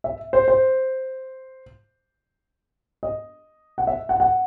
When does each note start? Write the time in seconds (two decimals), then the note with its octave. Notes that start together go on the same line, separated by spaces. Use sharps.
0.04 E5
0.33 C5
0.48 C5
3.03 D#5
3.78 F#5
3.87 E5
4.09 F#5
4.20 F#5